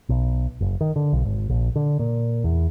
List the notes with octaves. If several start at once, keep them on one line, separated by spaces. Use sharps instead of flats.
B1
F#1
D#3
D3
B1
G#1
A#1
D3
A#2
E2